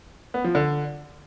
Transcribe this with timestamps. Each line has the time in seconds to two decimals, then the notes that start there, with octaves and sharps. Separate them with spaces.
0.34 B3
0.44 F3
0.55 D3